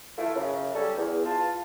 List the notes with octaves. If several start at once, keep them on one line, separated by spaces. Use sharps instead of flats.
E3 A3 E4 F4
F#2 C#3
C#3 G3 C#4 A4
E2
F4 A5